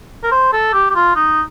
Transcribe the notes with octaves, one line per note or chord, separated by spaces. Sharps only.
A#4
C5
A4
G4
G4
F4
D#4